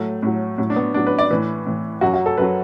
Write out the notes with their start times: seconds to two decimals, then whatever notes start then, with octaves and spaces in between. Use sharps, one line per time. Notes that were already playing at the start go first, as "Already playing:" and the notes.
Already playing: A2 F#3 A3
0.23 A2 F#3
0.58 A2 F#3
0.70 D4
0.76 B3
0.94 A2 F#3 D4
1.07 B4
1.19 D5
1.31 A2 E3 B4
1.66 A2 E3
2.01 F#2 F#3 F#4
2.13 F#4
2.26 A4
2.38 F#2 F#3 B4